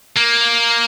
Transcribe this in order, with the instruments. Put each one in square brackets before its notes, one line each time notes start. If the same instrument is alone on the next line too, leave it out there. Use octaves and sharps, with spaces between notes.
[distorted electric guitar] A#3